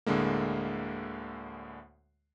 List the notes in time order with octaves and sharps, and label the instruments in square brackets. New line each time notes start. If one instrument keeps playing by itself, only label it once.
[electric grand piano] D2 A2 D3 G#3 A#3